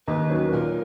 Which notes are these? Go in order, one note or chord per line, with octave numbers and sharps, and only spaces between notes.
D#2 B4
D#3 F#3 C#4
A#2 A#4